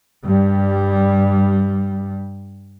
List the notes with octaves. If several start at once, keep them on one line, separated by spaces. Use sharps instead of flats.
G2 G3